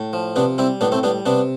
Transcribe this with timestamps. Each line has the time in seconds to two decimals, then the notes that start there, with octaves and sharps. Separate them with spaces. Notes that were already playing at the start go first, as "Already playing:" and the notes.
Already playing: A2
0.13 F3
0.36 C3 B3 D4
0.58 G3 C4 E4
0.81 A2 B3 D4
0.92 A3 C4
1.03 G3 B3 D4
1.26 C3 B3 D4